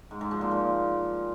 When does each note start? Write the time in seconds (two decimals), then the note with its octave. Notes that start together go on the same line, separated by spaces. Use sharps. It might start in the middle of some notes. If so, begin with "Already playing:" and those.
0.11 G#2
0.21 G#2
0.31 F3
0.41 A#2
0.51 A#2